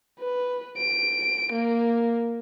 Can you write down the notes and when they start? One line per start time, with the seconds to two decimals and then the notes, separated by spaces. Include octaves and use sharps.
0.20 B4
0.78 D7
1.52 A#3